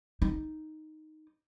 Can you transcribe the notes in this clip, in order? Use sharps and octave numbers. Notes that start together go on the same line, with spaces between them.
D#4